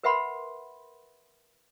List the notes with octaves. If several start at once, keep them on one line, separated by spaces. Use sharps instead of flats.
A#4 B4 E5 F#5 B5 C6